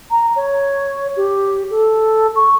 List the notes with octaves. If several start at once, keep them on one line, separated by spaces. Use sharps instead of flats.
A#5
C#5
G4
A4
C#6